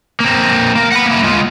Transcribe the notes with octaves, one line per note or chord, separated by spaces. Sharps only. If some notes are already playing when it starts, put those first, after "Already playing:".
A#3 C4
A#3
F#5 B5
A#3 E4
G#3 F4